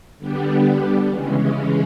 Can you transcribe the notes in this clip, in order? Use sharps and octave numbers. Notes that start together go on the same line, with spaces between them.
D3 G3 B3 D4 G4
C#3 E3 G#3 C#4